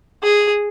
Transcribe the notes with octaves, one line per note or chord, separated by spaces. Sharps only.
G#4